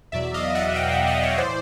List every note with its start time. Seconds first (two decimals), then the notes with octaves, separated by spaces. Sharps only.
0.12 E2 B2 F#3 D5 E5
0.34 D#5 F5
0.55 E5 F#5
0.75 F5 G5
0.91 E5 F#5
1.06 D#5 F5
1.23 C#5 D#5
1.38 A2 E3 C5 D5